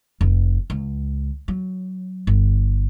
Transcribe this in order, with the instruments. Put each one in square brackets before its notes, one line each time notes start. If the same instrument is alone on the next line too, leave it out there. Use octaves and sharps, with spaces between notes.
[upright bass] F1
C#2
F#3
G1